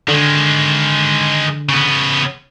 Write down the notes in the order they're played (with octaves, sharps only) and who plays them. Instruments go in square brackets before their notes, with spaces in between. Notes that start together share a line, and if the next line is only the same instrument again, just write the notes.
[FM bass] D3 [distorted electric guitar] D#3 G#3
[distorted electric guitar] C#3 B3